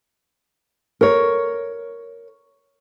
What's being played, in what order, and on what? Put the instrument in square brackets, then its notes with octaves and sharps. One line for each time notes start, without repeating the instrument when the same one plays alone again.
[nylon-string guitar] A#4 C#5